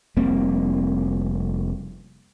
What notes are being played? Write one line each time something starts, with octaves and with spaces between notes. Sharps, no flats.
F1 G3 A#3 C4